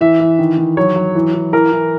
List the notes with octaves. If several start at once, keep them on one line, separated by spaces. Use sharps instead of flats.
E3 E5
E3
D#3
D#3
F#3 C#5
F#3
E3
E3
E3 A#4
E3